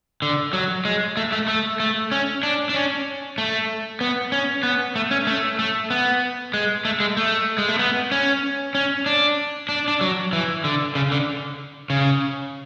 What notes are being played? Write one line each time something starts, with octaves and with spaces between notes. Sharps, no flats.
D3
F#3
G#3
A3
A3
A3
A3
C#4
D4
D4
C#4
A3
B3
C#4
B3
A3
C#4
A3
A3
B3
G#3
A3
G#3
A3
G#3
A3
B3
C#4
C#4
D4
D4
D4
F#3
E3
D3
C#3
D3
C#3